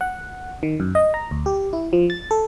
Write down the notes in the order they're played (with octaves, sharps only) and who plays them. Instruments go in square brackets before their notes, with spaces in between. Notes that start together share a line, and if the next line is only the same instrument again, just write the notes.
[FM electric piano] F#5
D#3
F#2
D#5
A#5
D2
G4
E4
F3
A6
A4